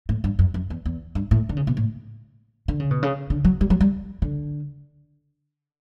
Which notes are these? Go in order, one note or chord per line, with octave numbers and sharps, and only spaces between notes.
A2
G2
F#2
F#2
E2
E2
G2
A2
D3
C#3
B2
A2
D3
C#3
B2
C#3
D3
F#3
G3
F#3
G3
D3